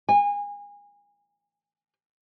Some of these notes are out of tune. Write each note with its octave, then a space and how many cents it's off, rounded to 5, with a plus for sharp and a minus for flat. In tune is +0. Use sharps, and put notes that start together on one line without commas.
G#5 -30